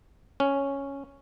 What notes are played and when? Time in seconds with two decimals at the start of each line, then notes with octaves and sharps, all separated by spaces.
0.40 C#4